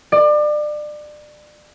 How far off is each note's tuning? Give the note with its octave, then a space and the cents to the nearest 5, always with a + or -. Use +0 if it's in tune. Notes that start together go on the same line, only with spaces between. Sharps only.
D5 +30